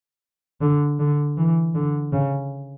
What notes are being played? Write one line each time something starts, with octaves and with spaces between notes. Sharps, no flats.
D3
D3
E3
D3
C#3